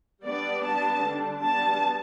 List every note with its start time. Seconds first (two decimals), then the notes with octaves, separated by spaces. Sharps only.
0.23 G3 B3 D4 D5
0.64 G3 B3 D4 A5
1.03 D3 G3 D4
1.42 G3 B3 D4 A5